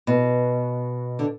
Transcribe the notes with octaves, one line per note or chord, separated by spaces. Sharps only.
B2
D3